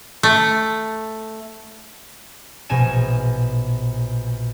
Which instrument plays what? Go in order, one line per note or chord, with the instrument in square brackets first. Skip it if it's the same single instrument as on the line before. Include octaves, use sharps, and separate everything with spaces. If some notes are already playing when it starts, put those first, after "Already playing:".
[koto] A3
[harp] A#1 B2 D#4 G#5 D#7 E7